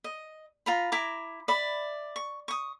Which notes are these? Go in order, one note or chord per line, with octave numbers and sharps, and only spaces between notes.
D#5
F4 A#5 B5
E4 A#5 D6
D5 E5 B5
C#6
C#6 D#6